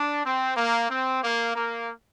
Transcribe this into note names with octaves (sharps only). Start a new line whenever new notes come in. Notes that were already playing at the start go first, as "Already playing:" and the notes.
Already playing: D4
C4
A#3
C4
A#3
A#3